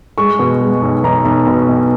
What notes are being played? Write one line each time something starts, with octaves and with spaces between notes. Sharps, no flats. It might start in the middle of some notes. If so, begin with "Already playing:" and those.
G#3 C#6
B2
G#3
B1
B1 A#5
B1
B2
B1